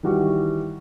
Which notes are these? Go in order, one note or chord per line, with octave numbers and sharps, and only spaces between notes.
D#3 E3 G3 F#4